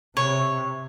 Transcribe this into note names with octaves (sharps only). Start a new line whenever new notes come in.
C3 C#5